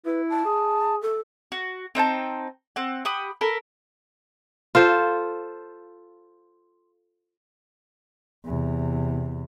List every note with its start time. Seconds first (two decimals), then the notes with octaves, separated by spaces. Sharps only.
0.06 E4 B4
0.30 A5
0.46 G#4
1.02 A4
1.52 F#4
1.95 C4 D#4 G5 A5
2.76 C4 F#5
3.05 G4 F#5 B5 D#6
3.41 A4 A#4 B5
4.75 F4 A4 C5
8.46 E2 C3